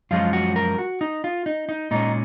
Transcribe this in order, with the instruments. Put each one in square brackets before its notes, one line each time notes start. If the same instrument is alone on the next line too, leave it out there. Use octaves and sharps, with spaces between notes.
[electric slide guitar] F#2 F3 G#3 C#4 F4
F#4
A#4
F#4
D#4
F4
D#4
D#4
A#2 G#3 C#4 D#4